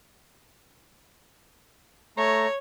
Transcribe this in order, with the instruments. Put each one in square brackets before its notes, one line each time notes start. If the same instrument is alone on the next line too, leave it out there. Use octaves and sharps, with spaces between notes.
[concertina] A3 A#5 [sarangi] C#5